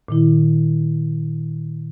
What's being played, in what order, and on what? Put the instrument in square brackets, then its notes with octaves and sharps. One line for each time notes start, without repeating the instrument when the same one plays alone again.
[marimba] A#2 D#3 E4